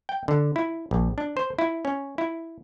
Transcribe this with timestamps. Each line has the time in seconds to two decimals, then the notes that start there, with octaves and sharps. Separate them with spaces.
0.09 G5
0.28 D3
0.56 E4
0.91 A#1
1.18 D4
1.37 C5
1.59 E4
1.85 C#4
2.18 E4